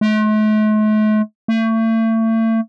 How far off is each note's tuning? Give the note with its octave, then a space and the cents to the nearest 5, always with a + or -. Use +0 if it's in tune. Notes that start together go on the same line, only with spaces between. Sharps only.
A3 -45
A3 +35